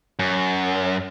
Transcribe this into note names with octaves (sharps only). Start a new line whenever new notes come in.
F#2